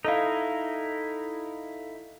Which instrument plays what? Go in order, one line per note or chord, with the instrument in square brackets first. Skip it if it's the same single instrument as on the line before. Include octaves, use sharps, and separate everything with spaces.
[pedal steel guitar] D#4 E4 [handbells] A4 D#5 F5